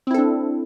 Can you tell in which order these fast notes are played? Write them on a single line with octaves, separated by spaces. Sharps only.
C4 E4 A4 D4